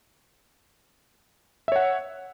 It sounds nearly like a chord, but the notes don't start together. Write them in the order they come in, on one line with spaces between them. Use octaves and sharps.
E5 C#5 F#5